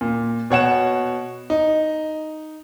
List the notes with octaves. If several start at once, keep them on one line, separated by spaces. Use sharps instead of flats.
A#2
B2 C#5 F#5 E7
D#4